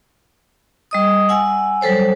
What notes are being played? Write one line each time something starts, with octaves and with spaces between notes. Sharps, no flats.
G3 D#5 D#6
F#5 G#5 E6
F#3 G3 A4 C5 C#5